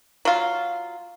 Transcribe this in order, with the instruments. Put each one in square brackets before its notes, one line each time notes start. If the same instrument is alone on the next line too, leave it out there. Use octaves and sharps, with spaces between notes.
[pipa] F#3 F4